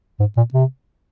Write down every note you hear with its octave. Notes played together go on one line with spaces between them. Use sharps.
G#2
A#2
C3